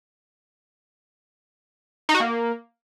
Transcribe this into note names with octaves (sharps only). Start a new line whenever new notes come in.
D#4
F#4
A#3